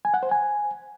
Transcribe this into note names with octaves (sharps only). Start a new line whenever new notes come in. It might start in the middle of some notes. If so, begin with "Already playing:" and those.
G#5
F#5
C5
G#5